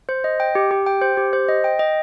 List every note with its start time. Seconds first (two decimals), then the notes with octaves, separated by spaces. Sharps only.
0.09 C5
0.24 D#5
0.40 G5
0.55 G4
0.71 G4
0.86 G5
1.02 C5
1.17 G4
1.33 C5
1.48 D#5
1.64 G5
1.79 D#5